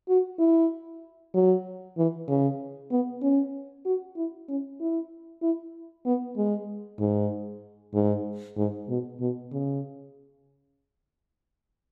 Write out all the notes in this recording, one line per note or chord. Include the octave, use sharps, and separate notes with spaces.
F#4
E4
F#3
E3
C#3
B3
C#4
F#4
E4
C#4
E4
E4
B3
G#3
G#2
G#2
G#2
B2
B2
C#3